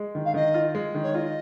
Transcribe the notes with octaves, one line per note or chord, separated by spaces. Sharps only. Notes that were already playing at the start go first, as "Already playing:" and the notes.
Already playing: G#3
D#3
F5
D#3 D#5
F4
G#3
D#3
C#5
F4 D#5